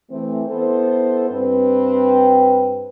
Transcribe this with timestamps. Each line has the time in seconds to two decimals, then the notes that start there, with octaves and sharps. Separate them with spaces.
0.10 E3 A3 C4
0.48 B3 E4 A4 C5
1.30 G2 C4 B4